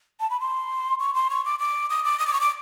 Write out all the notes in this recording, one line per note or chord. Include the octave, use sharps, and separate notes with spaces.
A5
B5
C6
C#6
C6
C#6
D6
D6
D#6
D6
D#6
D6
C#6
D6